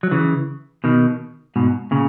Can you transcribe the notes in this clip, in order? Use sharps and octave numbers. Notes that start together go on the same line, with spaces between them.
F#3
C#3 E3
B2 D#3
G#2 B2
A#2 C#3